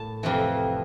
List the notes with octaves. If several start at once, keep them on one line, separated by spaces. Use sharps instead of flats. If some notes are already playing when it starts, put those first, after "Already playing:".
Already playing: A2 A#3 A5
F2 C3 E3